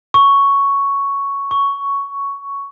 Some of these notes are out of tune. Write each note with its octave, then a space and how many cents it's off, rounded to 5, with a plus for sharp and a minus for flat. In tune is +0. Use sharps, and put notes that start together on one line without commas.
C#6 +5
C#6 +10